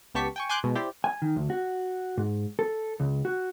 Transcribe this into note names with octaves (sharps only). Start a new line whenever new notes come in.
C#2 B3 G4 A5 C#6 B6
G5 G#5 C#6
G#5 C6 D6 F#6 G6 D7
B2 G#3
E4 G4 C5 D5
G#5
D#3
D2
F#4
G#2
A4
C#2
F#4